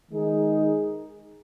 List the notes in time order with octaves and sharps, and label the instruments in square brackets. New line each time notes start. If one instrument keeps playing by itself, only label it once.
[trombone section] D#3 G#3 D#4 G#4